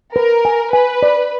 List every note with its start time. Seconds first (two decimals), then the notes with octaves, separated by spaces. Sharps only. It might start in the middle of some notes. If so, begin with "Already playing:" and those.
0.16 A#4 B4
0.45 G#5
0.73 B4 G#5
1.03 D5